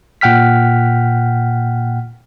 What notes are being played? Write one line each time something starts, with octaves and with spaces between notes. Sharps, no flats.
A#2 F#5 G5 F6 B6